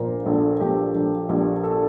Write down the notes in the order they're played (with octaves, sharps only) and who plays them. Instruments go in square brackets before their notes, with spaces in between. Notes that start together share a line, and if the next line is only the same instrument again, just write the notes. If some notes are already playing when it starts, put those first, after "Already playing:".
Already playing: [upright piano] A#1 A#2 F3 A#4 C5
A#1 A4
A#1 G4
A#1
A#1 G4
A4